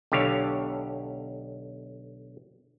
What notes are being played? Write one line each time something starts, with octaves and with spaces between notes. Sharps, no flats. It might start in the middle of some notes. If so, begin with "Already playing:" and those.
B1 D3 G4 C#5 F5